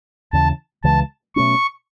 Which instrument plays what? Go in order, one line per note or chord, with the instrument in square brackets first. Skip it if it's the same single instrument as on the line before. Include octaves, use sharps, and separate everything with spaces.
[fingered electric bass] D#2 C#3 E3 [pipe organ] A5
[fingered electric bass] C#2 C#3 E3 G#3 [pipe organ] A5
[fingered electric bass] B2 F#3 A3 C#4 [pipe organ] C#6